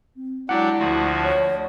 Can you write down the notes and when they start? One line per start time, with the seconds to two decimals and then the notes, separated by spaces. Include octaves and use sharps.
0.16 C4
0.49 F#3 G#3 D4 E4 G4 D5 F#5
0.79 D2 F3 A3 F#4 D5 A5
1.24 C#5